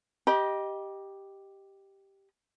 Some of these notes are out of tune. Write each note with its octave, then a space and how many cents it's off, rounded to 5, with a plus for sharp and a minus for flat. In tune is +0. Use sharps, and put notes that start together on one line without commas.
G4 +0 D#5 +0 B5 -45